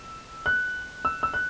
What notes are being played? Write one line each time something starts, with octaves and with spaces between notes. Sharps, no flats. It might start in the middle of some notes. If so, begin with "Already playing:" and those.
Already playing: E6
F#6
E6
E6
F#6